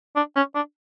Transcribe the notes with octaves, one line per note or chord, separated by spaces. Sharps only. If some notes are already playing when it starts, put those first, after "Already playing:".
D4
C#4
D4